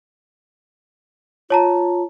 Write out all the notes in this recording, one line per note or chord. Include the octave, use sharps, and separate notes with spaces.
F4 C#5 A5 A#5